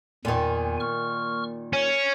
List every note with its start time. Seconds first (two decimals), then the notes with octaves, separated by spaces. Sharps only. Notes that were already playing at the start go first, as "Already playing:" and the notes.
0.25 E2 A#2 D#3 G#5
0.80 C#6 F6
1.73 C#4 C#5